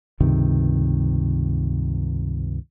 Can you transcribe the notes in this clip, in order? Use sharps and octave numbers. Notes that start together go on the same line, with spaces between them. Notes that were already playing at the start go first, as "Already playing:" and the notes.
C#2 G2 C3 D#3